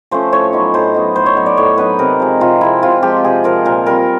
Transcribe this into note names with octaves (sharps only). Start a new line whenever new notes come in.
F3 A3 C#4 C5
A2 C#5
F#3 B3 D#4
A2 C5
F#3 B3 D#4
A2 C5
C#5
F#3 B3 D#4
D5
A2 C#5
F#3 B3 D#4 B4
C3 A#4
F3 G#3
C3 F4
F3 G#3 E4
C3 F4
F3 G#3 G4
C3 G#4
F3 G#3 A#4
A#2 A#4
G3 C4 A#4